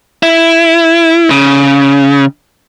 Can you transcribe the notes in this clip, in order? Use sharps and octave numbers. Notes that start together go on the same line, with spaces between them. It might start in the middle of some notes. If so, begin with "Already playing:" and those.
E4
C#3